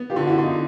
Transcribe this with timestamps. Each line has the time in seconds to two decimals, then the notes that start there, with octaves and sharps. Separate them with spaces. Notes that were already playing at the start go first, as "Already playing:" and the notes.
Already playing: B3
0.10 F4 G4
0.16 D3
0.27 E4 F#4
0.38 D3
0.44 D#4 F4